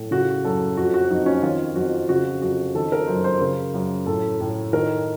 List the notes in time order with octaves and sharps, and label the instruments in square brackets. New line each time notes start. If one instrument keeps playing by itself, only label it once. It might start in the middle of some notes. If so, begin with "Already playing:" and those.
Already playing: [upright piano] A2
C#3 F#4
F#2 A4
F2 F#4
F#4
F2 D#4
C#4
D#3 F4
F2 F#4
C#3 F#4
F2 F#4
D#3 A4
A#4
F#2 C5
C5
C#3 A#4
F#2
A2 A4
A2
D#3 A#4